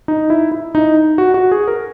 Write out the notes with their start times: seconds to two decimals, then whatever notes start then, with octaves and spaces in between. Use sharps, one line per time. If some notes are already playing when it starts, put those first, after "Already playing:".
0.08 D#4
0.30 E4
0.52 E4
0.75 D#4
1.18 F#4
1.34 F#4
1.51 G#4
1.68 A#4